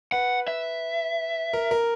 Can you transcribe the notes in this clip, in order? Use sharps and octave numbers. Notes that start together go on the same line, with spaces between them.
B4 F#5
E5
A#4
A#4